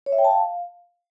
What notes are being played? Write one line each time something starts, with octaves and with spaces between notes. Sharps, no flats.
C#5
E5
G5
A5
F5